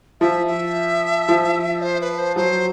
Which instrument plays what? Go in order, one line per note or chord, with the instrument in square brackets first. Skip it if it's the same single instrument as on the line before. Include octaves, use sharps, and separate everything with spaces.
[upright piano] F3 [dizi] E5
[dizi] E5
[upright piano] F3
[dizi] C5
B4
C5
[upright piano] F#3 [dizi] C5